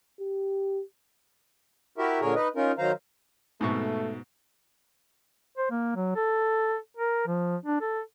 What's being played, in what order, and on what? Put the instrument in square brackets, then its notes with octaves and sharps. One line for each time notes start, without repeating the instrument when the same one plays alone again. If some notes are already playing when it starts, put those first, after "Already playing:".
[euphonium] G4
[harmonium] E4 F#4 G4 A#4 E5
A#2 D3 G#4 A#4 C#5
D#4 B4 D#5
C#4 D#4 F4 A#4
D#3 F#3 C5 F5 A#5
[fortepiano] G#2 B2 C#6 [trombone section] A3
[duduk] C5
A#3
F#3
A4
A#4
F3
D4
A4